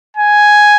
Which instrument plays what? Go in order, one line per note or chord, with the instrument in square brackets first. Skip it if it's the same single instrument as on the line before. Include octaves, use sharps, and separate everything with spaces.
[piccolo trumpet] G#5